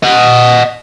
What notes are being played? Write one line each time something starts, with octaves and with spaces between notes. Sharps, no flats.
D#5 F#5